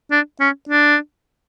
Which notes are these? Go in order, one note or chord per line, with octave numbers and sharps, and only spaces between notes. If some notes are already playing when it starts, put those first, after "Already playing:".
D4
C#4
D4